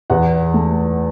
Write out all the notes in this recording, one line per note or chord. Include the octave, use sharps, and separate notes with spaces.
E2 F#5
A3